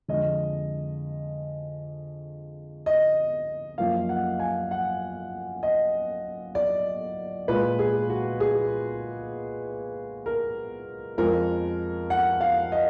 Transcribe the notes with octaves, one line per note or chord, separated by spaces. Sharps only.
F2 D3 G#3 D#5
D#5
F#2 F3 A#3 F5
F#5
G#5
F#5
D#5
D5
A#2 G#3 B4
G#4
F#4
G#4
A#4
F2 F3 G#3 A#4
F#5
F5
D#5